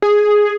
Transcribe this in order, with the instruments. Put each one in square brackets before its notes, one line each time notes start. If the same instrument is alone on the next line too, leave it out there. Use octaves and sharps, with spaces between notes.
[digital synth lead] G#4